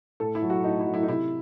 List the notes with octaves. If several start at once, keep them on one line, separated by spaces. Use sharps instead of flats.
A2 A4
E4
F#3
F#4
A2 D#4
E4
F#3
E4
D#4
C3 E4